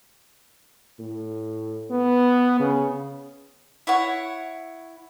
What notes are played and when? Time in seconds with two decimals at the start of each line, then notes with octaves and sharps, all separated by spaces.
0.99 A2
1.90 B3
2.59 C#3
3.87 E4 C#5 F#5